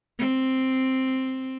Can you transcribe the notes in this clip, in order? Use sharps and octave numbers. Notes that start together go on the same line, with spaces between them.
C4